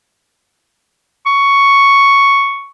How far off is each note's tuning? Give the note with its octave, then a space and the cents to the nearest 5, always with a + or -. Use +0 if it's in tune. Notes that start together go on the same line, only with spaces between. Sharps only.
C#6 +5